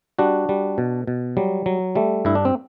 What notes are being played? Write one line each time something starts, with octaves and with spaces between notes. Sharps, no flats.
G3 D4 F#4
G3
B2
B2
F#3 G3
F#3
G3 A3
G2 E4
D4
C4